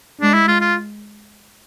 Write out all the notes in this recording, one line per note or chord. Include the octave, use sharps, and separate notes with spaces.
G#3 D4
E4
F4
F4